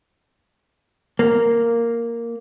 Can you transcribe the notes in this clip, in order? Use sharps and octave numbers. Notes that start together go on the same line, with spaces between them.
A#3